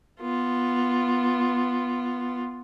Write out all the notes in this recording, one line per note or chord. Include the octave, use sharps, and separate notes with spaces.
B3 F4